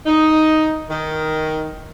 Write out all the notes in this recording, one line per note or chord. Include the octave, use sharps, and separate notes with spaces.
D#4
D#3